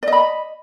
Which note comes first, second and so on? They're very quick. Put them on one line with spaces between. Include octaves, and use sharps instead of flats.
D5 D#5 B5